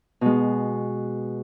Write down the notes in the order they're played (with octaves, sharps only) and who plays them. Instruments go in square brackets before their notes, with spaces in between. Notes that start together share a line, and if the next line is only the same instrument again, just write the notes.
[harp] B2 G#3